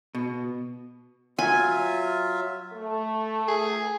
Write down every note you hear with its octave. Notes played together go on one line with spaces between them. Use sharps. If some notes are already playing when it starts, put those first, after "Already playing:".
B2
F#3 F4 E5 G#5
A3
G#4